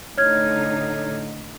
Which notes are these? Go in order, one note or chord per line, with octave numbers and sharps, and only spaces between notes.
A2 D3 D#4 C#5 F6 G#6